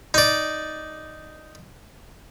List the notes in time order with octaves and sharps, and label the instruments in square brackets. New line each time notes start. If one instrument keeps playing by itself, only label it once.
[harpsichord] D#4 D5